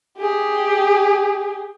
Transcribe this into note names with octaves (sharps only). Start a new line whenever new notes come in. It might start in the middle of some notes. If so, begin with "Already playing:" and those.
G4 G#4